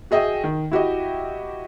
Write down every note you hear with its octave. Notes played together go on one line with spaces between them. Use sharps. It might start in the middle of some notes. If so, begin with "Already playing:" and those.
F#4 G#4 D#5 E5 G5
D#3
E4 F#4 G4 D#5